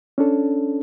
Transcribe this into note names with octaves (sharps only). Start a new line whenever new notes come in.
C#4 D4 A4